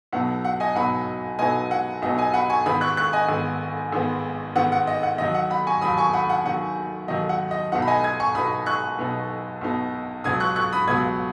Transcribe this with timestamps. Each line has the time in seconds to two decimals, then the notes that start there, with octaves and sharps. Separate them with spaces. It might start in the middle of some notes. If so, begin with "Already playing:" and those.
0.13 B1 B2 F#3 B3 D#4 F#5
0.45 F#5
0.60 D#5 G#5
0.75 B1 B2 F#3 B3 D#4 F#5 B5
1.39 B1 B2 F#3 B3 D#4 D#5 G#5
1.71 F#5
2.02 B1 B2 F#3 B3 D#4 D#5
2.18 D#5 G#5
2.34 F#5 B5
2.50 G#5 C#6
2.66 G#1 G#2 D#3 B3 B5 D#6
2.81 C#6 F#6
2.97 C#6 F#6
3.13 D#5 G#5
3.29 G#1 G#2 D#3 B3
3.93 G#1 G#2 D#3 B3
4.56 G#1 G#2 D#3 B3 F#5
4.72 F#5
4.87 D#5
5.03 F#5
5.18 D#2 D#3 F#3 D#5
5.35 F#5
5.50 F#5 B5
5.67 G#5 C#6
5.82 D#2 D#3 F#3 B5 D#6
5.97 G#5 C#6
6.13 F#5 B5
6.29 F#5
6.45 D#2 D#3 F#3 F#5
7.08 D#2 D#3 F#3 D#5
7.29 F#5
7.51 D#5
7.72 B1 B2 B3 D#4 F#5
7.82 B5
7.87 D#5 G#5
8.04 D#6 G#6
8.20 G#5 C#6
8.35 B1 B2 B3 D#4 B5 D#6
8.66 C#6 F#6
8.99 B1 B2 B3 D#4
9.61 B1 B2 B3 D#4
10.24 C#2 B2 F#3 B3 D#6 G#6
10.40 C#6 F#6
10.56 C#6 F#6
10.73 B5 D#6
10.88 C#2 B2 F#3 B3 D#6 G#6